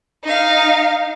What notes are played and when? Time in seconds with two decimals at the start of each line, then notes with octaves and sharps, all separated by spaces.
0.24 D#4 F5